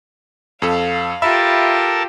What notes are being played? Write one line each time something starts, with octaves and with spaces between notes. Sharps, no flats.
F2 A4 F5
F4 G4 A4 A#4 E5 A5 B5 E6